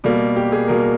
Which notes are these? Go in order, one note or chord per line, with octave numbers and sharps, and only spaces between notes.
B2 G3 A#3
G4
G#4
B2 G3 A#3 A#4